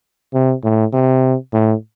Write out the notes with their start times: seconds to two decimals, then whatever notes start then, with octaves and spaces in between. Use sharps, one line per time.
0.34 C3
0.64 A2
0.93 C3
1.53 A2